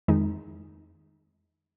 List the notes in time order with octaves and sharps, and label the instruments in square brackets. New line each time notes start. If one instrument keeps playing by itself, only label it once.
[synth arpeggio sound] F2 D#3 G#3 D#4